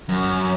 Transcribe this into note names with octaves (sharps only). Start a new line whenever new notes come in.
F#2